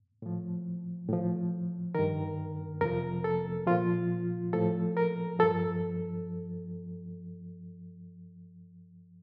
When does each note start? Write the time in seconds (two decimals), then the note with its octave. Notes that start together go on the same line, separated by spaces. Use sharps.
0.22 A2 F3
1.08 A2 F3
1.95 G2 D#3 A#4
2.81 F2 C3 F3 A#4
3.24 A4
3.67 A#2 F3 F4
4.53 A2 F3 A4
4.97 A#4
5.39 G2 F3 A4